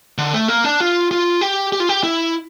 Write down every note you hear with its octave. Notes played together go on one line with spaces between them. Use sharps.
D3
A3
A#3
D4
F4
F4
G4
G4
F4
G4
E4